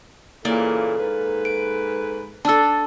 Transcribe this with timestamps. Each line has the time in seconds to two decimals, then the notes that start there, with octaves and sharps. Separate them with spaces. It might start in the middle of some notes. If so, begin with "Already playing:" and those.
0.45 A#2 C#3 E3 A#3 A4 D5
0.99 G#2 B4
1.45 D7
2.45 D4 A4 A5 E6